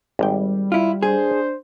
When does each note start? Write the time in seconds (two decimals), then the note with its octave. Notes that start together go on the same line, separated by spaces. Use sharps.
0.19 G#1 G3 G5
0.72 E4 F4
1.03 D4 G#4 C5